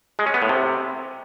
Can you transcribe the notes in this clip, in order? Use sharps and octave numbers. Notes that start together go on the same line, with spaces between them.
G#3
C#4
B3
A2
C3